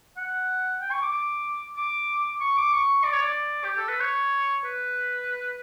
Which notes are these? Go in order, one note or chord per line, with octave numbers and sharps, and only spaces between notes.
F#5
G5
C#6
D6
D6
D6
C#6
D6
C#6
D5
C#5
D5
G4
A4
B4
C#5
B4